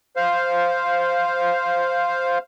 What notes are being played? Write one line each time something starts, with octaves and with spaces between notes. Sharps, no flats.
C5 F5